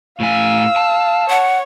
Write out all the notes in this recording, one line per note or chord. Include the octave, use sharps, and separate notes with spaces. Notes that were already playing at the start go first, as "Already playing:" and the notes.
A2 F5 G#5 E6
A5
C#5 F#5